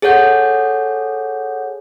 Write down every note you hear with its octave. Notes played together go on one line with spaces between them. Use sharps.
G#4 A4 C#5 F#5 G6